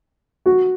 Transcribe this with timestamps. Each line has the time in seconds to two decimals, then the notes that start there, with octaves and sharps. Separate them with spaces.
0.46 F#4